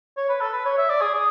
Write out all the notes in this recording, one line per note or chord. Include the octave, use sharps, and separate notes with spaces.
C#5
B4
A4
B4
C#5
E5
D5
G#4
G#4